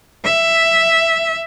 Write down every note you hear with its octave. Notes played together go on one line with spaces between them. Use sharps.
E5